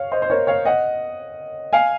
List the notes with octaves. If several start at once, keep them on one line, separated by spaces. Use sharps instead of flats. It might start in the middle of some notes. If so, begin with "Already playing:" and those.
Already playing: C#5 F5
C5 D#5
C5
A#4 C#5
C#5 F5
D#5 F#5
F5 G#5